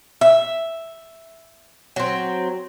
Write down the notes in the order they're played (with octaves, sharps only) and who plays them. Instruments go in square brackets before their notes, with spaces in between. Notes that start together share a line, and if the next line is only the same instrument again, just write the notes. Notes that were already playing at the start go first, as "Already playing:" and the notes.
[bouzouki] E5
F#3 C4